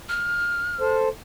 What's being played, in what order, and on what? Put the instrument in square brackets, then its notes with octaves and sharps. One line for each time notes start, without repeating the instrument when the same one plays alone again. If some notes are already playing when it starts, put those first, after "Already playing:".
[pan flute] F6
[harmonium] A4 C5